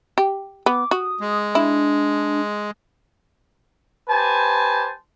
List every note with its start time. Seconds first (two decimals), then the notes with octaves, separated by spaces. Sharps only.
0.18 G4
0.66 B3 D6
0.91 F#4 D#6
1.20 G#3
1.55 D4 E4
4.09 G4 B4 C5 G#5 A5